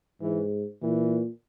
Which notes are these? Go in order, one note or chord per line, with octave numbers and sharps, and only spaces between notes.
G#2 E3
A#2 E3